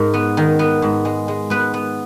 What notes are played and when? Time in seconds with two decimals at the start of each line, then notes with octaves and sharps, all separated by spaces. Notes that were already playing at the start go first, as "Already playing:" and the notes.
Already playing: G#2 A#4
0.14 B3
0.37 D#3
0.59 B3
0.82 G#2
1.05 G#3
1.28 G#3
1.50 B3 B4
1.74 B3